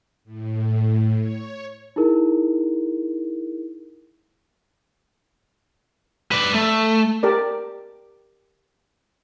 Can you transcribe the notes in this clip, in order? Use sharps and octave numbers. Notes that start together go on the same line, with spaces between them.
A2
C#5
D#4 E4 G#4 A#4
B4 D5
A3
G4 A#4 D5